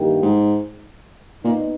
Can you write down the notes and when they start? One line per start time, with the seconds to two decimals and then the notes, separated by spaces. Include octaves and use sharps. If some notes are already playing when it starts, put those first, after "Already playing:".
Already playing: G2 D#3 A#3 E4 G4
0.22 G#2
1.44 A#2 B3 D#4